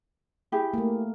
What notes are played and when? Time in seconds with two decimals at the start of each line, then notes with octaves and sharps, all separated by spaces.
0.52 E4 G4 G#4
0.74 A3 A#3